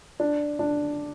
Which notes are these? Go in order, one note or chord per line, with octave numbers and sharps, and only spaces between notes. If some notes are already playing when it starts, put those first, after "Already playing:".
D4
D4